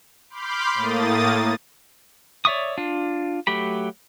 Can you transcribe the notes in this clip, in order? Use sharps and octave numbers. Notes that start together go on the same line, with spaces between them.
B5 C6 D6 F6 G6
A2 A#3 D#6 A6
C#5 D5 E5 C#6 D#6
D4 F4
F#3 A3 G4 B5